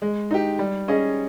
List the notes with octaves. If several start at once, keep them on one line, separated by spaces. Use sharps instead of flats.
G#3
D#4 G4
G3
C#4 G#4 D#5